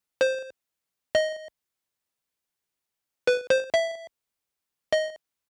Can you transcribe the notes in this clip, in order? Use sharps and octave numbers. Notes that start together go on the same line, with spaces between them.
C5
D#5
B4
C5
E5
D#5